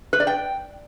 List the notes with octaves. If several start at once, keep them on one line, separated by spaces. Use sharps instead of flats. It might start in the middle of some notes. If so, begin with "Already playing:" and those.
B4
D5
G5